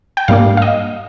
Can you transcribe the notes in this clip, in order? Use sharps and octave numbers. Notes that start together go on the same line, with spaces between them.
G5
G#2 G3 A#3 D4 F5
F5
D#5